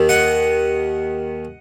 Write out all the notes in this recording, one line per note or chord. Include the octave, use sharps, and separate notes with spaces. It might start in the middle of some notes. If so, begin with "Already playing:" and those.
Already playing: D#2 D#3
D#5 F#5